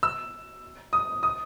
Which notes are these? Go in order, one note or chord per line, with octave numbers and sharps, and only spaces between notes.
E6
D#6
D#6